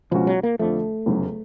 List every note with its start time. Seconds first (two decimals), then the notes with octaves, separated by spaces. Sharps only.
0.11 C#2 B2 F3 G#3 C#4 F#4
0.27 F#3
0.43 A#3
0.59 F2 D3 F3 A3
1.06 F1 E2 C#3 F#3